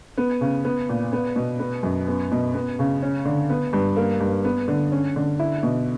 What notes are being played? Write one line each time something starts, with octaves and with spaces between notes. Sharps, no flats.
B3
C#3
B3
A#2
B3
B2
B3
F#2
B3
B2
B3
C#3
C#4
D3
B3
G2
A#3
G2
B3
D3
C#4
D3
E4
B2